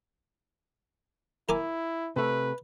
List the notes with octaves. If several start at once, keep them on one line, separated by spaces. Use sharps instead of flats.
E4 A#4 G#5 D6
C3 A3 B4